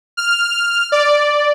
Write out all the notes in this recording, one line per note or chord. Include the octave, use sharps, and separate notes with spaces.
F6
D5